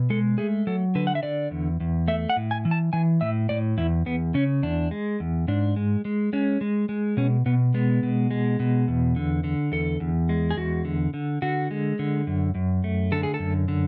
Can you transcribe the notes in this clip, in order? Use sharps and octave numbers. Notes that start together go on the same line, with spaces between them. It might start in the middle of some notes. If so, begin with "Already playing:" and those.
Already playing: B2
G#3 A4
A3 G#4
F#3 A4
D3 B4
F#5
E5
D3 D5
E2
E2
A3 E5
F#5
A2
G#5
E3
A5
E3 G#5
A2 E5
A2 D5
E2 E4
E2 B3
C#3 C#4
E2 D4
G#3
E2
G#2 D4
G#3
G#3
G#3 C#4
G#3
G#3
B2 C#4
B2 B3
G#3 B3
B2
G#3
B2
E2
D3
D3
E2 A4
E2
G#3
G#4
E2 F#4
D3
D3
D3 F#4
G#3
D3
F#2
F#2
A3
D3 A4
G#4
A4
F#2
D3